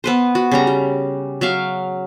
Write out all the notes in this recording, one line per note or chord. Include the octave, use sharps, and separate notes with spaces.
B3 B4 C5
F#4
C#3 G3 A#5
G4
F#3 E5 F5